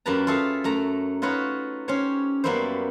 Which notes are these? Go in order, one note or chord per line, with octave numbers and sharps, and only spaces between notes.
F#2 A#3 G4 B4 A5 A#5
F4 G#4 A4 E5 F5
F#2 A3 A#5
D#4 F4 F#4 B4 C#5
C#4 G4 C5 C#5
F#2 G3 A#3 B3 E4 C5